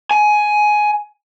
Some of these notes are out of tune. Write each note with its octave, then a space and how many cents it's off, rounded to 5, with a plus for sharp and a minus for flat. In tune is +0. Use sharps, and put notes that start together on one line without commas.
G#5 +15